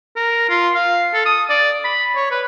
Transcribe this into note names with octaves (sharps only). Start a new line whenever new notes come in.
A#4
F4
F5
A4
D#6
D5
B5
C#5
B4